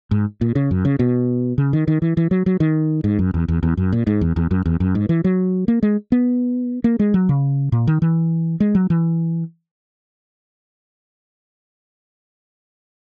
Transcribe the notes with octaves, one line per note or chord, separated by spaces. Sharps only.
G#2
A#2
C#3
F#2
C#3
B2
C#3
D#3
D#3
E3
E3
F#3
F#3
D#3
G#2
F#2
E2
E2
E2
F#2
A#2
G#2
E2
E2
F#2
E2
F#2
G#2
E3
F#3
A#3
G#3
B3
A#3
G#3
F#3
C#3
A#2
D#3
E3
G#3
F#3
E3